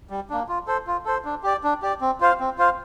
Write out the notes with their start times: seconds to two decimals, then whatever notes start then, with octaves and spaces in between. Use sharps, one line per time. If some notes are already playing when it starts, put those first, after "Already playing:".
0.10 G3
0.30 A#3 D4
0.49 F4
0.67 A4 C5
0.87 F4
1.05 A4 C5
1.25 D4
1.43 G4 D5
1.64 D4
1.82 G4 D5
2.01 C4
2.20 F4 C5 F5
2.40 C4
2.58 F4 C5 F5